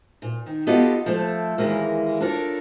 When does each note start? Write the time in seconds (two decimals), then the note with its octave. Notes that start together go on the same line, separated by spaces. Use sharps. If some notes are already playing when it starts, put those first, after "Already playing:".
0.22 A#2
0.46 D#3
0.67 B3 F4 G4 A4 D#5 F5
1.06 F3 A3 A4
1.58 D#2 E3 G#3 A#3
2.20 D4 F4 A4 A#4 C#5